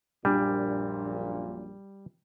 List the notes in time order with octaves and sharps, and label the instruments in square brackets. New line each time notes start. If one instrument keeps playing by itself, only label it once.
[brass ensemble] A#1 F#2 A#2 [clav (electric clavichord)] G3 [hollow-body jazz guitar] D4 G#5